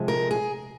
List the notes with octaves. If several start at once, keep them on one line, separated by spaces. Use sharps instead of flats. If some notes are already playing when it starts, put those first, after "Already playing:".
Already playing: C3 F3 G#3
A#4
G#4